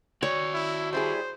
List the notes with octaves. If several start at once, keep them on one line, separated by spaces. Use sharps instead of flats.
F#4 C#5 D5
E4
G3 E4 G#4 C5